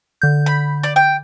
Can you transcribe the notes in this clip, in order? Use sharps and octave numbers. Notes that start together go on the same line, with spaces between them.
D3 G6
B5
D5
G5